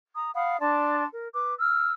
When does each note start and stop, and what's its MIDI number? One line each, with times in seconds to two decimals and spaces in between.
0.15 0.31 82
0.15 0.31 87
0.35 0.58 77
0.35 0.58 78
0.35 0.58 83
0.35 0.58 87
0.59 1.04 62
0.59 1.04 74
0.59 1.04 81
0.59 1.04 84
1.12 1.27 70
1.34 1.54 71
1.34 1.54 86
1.59 1.92 88
1.59 1.92 89